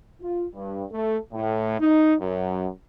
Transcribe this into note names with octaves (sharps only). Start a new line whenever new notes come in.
F4
G2
A3
A2
D#4
F#2